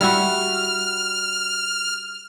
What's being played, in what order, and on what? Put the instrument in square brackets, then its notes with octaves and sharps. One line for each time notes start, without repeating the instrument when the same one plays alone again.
[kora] G3 E4 F#4 [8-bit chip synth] F6